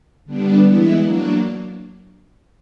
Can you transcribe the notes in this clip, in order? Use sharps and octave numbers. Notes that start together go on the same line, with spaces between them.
D3 G3 B3 D4
E3 G#3 B3 E4
F#3 A#3 D4